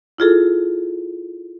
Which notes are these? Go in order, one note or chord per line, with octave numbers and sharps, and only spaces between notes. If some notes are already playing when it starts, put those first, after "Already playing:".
E4 F4 G#4 A4